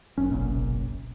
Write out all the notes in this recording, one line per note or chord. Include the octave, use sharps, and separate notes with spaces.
F#1 F#2 C#4
F#1 B1 F#2 A#2